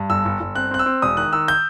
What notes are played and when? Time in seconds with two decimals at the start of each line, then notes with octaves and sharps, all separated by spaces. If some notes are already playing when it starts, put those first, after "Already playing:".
Already playing: G2
0.10 G1 E6
0.25 G1
0.40 G1
0.56 C4 F#6
0.71 C4 F#6
0.79 E6
0.86 C4
1.02 E1 D#6
1.17 D#3 F#6
1.33 D#3 E6
1.48 G6